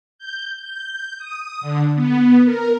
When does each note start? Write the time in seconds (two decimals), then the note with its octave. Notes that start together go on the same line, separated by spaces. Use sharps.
0.19 G6
0.62 G6
1.18 D#6
1.61 D3
1.95 B3
2.45 A#4